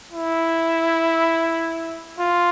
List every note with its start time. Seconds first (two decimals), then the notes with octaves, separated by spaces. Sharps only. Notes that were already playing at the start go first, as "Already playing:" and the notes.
0.12 E4
2.19 F4